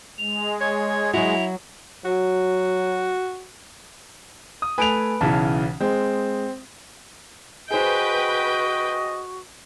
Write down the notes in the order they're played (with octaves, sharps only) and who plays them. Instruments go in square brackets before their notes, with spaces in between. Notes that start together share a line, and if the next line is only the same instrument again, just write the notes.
[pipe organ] G#3 [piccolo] F7
[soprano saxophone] C#5 [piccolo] G#6
[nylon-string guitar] F#3 F#4 [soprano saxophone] E4 [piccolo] F7
[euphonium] F#3 [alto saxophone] F#4
[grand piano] D#6
[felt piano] A3 G#5 [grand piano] B4 D7 F7
[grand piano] B1 C#3 E3 [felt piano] A5
[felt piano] G#3 [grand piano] C4
[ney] F#4 [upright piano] G#4 C5 [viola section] B4 G5 [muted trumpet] D#5